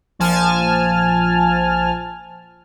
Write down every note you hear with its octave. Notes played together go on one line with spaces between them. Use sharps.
A#1 F3 G#5 A5 F6